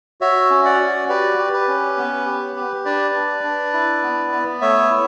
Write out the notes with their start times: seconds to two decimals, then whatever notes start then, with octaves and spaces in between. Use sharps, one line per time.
0.21 F#4 C#5 E5
0.50 C#4
0.65 D5 F#5
0.80 F#4
1.09 G4 B4 D5
1.38 G4
1.53 B4
1.68 C#4
1.97 B3
2.26 G4
2.56 G4
2.85 D4 B4 D5
3.15 D4
3.44 D4
3.73 E4
4.03 B3
4.32 B3
4.61 A3 C#5 E5
4.90 E4